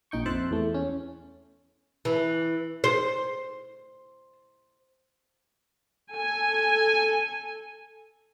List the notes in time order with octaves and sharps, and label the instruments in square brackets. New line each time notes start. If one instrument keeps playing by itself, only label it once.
[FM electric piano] A#1 D#4 G5 C#6
F2 C5 E5 A5 F#6
E2 A3
C#4
[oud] E3
C5
[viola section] A4 G#5